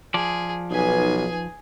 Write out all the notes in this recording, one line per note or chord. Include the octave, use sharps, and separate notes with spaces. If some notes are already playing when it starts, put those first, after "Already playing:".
F3 G#4 D5
B1 D#4 G#4 B4 G#5